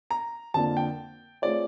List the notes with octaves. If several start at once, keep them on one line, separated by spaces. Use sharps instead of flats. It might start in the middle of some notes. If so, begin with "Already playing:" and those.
A#5
F2 D3 F3 A#3 A5
G5
A3 C4 F4 G#4 C#5 D5